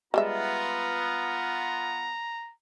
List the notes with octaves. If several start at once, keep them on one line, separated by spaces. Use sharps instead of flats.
G3 G#3 B3 F4 E5 A#5